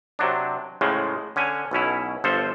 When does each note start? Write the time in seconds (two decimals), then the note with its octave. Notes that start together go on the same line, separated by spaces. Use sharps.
0.19 C3 F#3 D4
0.81 A2 C#3 F3 G#3
1.36 D3 C#4 G#5
1.71 B1 B2 C#4 E4
2.24 G1 F3 A4 C5